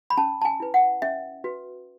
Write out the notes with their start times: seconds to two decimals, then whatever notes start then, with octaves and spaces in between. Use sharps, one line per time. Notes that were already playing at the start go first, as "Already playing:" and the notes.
0.10 B5
0.17 C#4 A5
0.41 A5
0.45 G#5
0.60 E4 B4
0.74 F#5
1.02 C#4 E5
1.44 F#4 B4